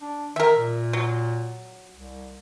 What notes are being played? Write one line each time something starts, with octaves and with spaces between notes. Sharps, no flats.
D4
D#3 A#4 E5
A#2
F#3
C2